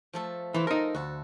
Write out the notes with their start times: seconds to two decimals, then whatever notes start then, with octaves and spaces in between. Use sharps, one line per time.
0.13 F3 A3 A4
0.54 E3 A4 C5 A5
0.67 D#4 A4 A#4
0.95 D2 F#4 A4